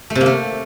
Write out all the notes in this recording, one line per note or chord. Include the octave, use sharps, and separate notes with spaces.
A3
C3
A#3
A3